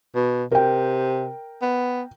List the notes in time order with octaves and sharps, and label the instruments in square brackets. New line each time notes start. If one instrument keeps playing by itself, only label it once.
[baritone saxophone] B2
[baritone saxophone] C3 [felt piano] A#4 G5
[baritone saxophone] B3